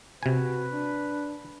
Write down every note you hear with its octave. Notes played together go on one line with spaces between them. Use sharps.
C3 F#4 B4 G#5
D4